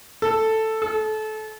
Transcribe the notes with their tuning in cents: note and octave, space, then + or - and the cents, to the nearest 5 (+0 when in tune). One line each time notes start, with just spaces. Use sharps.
A4 +5
A4 -25